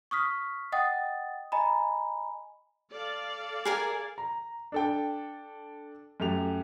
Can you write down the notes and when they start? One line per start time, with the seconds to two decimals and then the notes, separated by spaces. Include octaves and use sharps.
0.11 C#6 D#6 F6 B6
0.72 D#5 F#5 G5 D#6 A6
1.52 D#5 G#5 A#5 B5
2.91 A4 D5 F5
3.65 G#4 A#4 G#5
4.18 A#5
4.72 D4 A4 G5
6.20 F#2 A3 G4 F7